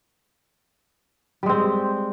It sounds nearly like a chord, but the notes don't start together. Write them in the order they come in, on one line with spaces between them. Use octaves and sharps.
G3 G#3 C4